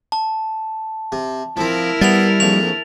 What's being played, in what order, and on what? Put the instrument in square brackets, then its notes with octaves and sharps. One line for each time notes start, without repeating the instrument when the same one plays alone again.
[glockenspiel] A5
[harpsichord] C3
[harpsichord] F3 C4 [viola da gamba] E4 A#4
[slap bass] G3 [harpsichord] B3 E5 [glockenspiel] A6 F7
[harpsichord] A#1 F2 C#6 [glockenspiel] F7